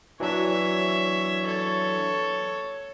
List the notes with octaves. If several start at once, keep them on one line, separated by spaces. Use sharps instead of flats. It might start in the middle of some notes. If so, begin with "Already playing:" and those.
E3 F#3 D4 C#5 E5
A4 C#5